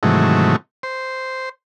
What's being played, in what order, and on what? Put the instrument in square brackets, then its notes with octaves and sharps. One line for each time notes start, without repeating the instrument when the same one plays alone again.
[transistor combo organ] G#2 C3 D#3 E3 F#3 A3
C5